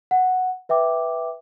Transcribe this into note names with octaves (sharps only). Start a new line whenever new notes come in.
F#5
B4 E5 G5 D6